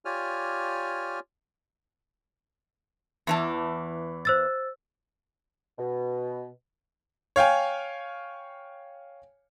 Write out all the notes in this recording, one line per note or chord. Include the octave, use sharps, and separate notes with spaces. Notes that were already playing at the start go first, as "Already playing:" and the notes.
F4 G4 C#5 D5 G#5 F6
E2 E3 A5
C5 E6 A6
B2
C#5 F5 G5 G#5